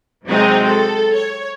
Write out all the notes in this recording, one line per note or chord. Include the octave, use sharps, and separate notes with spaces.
C3 F#3 G#3 C4 D#4
A4
C#5